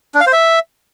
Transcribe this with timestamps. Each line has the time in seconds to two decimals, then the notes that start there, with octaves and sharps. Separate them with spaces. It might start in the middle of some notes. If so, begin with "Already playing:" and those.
0.15 D4
0.21 F5
0.27 C5
0.33 E5